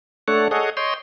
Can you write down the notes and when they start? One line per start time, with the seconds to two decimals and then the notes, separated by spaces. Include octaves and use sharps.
0.28 A3 D4 A4 C#5 F#5
0.51 G#4 A4 C#5 D#5 F#5
0.77 C#5 D#5 G5 C6